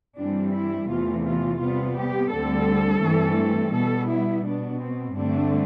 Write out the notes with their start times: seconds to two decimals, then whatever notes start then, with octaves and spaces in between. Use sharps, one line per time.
0.17 G2 E3 G3 C4 D4
0.53 E4
0.89 E2 C3 E3 A3 F4
1.25 F4
1.59 C3 G3 B3 F4
1.96 G4
2.31 D2 D3 G3 C4 A4
3.02 G2 E3 A3 C4
3.74 B2 G3 B3 A4
4.09 E4
4.45 B2 B3 D4
4.81 C4
5.16 G2 D3 A3 C4 D4